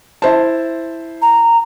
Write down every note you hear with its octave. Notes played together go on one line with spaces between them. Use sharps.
E4 C5 A5
A#5